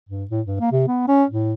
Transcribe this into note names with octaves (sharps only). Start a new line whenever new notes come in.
G2
A2
G2
A#3
C3
B3
C#4
A2